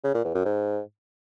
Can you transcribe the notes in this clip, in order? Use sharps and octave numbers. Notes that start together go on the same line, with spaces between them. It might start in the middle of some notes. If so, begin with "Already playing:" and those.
C#3
A#2
E2
F#2
G#2